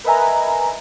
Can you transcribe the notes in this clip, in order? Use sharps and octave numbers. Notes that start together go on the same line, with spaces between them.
A#4 B4 D#5 E5 G#5 A#5